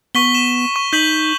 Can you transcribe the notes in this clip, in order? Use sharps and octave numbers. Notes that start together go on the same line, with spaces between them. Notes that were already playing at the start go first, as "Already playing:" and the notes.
B3 C#6 B6 G7
E7
C#6
D#4 G6 B6 F#7